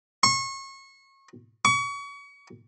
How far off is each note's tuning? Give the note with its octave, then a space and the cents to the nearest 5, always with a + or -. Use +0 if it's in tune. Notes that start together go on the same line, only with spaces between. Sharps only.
C#6 -30
C#6 +35